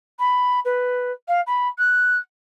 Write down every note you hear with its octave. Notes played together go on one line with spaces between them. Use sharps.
B5
B4
F5
B5
F#6